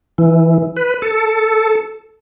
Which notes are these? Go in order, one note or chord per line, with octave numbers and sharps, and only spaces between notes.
E3
B4
A4